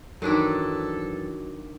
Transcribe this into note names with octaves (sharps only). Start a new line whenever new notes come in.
F#2 D#3 E3 F#3 D4 E4 A4